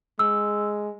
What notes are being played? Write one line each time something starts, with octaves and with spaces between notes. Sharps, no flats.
G#3 E6